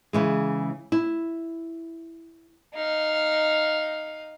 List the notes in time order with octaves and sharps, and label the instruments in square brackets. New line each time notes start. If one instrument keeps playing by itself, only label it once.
[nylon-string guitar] C#3 E3 G#3
E4
[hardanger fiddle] D#4 F5